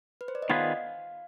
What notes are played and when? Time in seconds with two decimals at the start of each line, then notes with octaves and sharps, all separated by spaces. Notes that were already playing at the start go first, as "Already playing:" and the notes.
0.21 B4
0.28 C5
0.35 D5
0.42 D#5
0.50 D#3 B3 F4 G#4 B4 F5